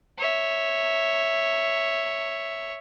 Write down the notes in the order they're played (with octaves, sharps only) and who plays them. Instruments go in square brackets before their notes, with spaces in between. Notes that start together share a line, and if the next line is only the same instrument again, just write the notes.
[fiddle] C#5 E5